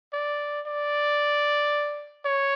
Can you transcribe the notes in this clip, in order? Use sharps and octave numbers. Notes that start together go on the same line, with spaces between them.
D5
D5
C#5